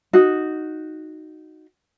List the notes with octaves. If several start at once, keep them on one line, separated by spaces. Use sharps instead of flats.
D#4 F#4